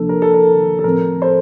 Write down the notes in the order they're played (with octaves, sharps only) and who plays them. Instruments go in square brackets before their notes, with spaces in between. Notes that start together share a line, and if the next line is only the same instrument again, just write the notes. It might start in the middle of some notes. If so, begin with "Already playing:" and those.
Already playing: [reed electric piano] D2 C3 F3 A#3 D4 [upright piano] A4
[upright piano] A#4
A4
A#4
A4
[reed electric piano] A2 F3 C4 [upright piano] A#4
[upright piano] A4 C5